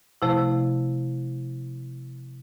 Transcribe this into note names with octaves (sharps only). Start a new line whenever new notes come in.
C3 F3 A3 E4